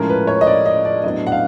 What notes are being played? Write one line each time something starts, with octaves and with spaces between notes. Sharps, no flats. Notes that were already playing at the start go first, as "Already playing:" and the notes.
Already playing: A2 F3 G#3 C#4 A#4
B4
C#5
D#5
D5
D#5
D5
A2 F#3 B3 D4 D#5
F#5
F5